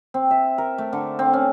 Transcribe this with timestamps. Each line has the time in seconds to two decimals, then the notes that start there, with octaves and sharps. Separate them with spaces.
0.14 C4
0.31 E5
0.58 A#4
0.78 A3
0.93 D3
1.19 C4
1.33 C#4